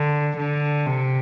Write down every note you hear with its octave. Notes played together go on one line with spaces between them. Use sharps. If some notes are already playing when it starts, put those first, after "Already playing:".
Already playing: D3
D3
C3